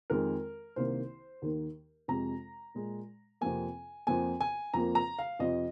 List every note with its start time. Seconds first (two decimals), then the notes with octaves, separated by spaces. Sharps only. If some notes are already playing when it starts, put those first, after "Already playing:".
0.10 F2 D#3 G#3 A#4
0.76 C2 C3 D#3 A#3 C5
1.42 D#2 D#3 A#3
2.08 F2 C3 G#3 A#5
2.75 A#2 G#3
3.41 F2 C3 F3 A#3 G#5
4.07 F2 F3 A#3 G#5
4.41 G#5
4.74 F2 F3 A#3 A#5
4.95 A#5
5.19 F5
5.39 F2 C3 F3 D#5